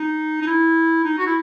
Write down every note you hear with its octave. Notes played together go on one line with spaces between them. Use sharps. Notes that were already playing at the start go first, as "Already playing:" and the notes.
Already playing: D#4
D#4
E4
D#4
F#4
E4